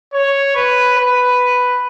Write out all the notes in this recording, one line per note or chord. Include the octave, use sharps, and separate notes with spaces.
C#5
B4
B4